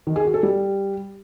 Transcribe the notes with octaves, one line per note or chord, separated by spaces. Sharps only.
D#3
G#4
F#4
A4
G3